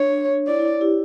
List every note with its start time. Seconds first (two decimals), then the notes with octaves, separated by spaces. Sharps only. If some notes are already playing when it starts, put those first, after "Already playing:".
Already playing: D4 C#5
0.48 E4 D5
0.59 E4
0.81 E4 G4